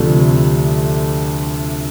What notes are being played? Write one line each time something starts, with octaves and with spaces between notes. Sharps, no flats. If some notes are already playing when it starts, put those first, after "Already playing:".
Already playing: D2 C3 F3 A3 D4